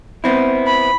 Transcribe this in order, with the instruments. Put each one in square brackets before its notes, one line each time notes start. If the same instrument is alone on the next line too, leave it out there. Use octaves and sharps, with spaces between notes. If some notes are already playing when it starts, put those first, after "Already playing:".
[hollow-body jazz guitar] B3 C4 E4
[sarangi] B5